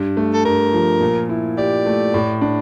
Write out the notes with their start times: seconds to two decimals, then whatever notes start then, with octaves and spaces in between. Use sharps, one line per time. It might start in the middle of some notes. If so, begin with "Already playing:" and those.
Already playing: G2
0.17 A3
0.34 A4
0.45 G2 A#4
0.73 F3
1.01 A#2
1.29 E4
1.57 G4 D5
1.86 A3
2.14 A2
2.41 D4